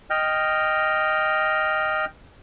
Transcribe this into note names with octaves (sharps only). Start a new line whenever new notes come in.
D#5 G5 F6